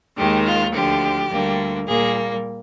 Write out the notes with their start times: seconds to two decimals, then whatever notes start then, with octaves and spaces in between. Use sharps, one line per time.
0.17 D#2 D#3 G#3 G4
0.46 F4
0.73 D2 D3 F3 G4
1.30 D2 D3 G3 A#3
1.87 A#2 G3 A#3 G#4